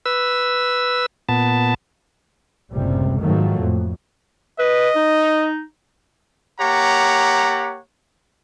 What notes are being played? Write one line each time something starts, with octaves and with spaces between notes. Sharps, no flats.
B4 E6
A#2 B3 A5
F#1 C#2 A2 C3 G3
G#2 D#3 F3 F#3 A3 A#3
F2 A2
B4 D#5
D#4
A#3 G4 C#5 F#5 A#5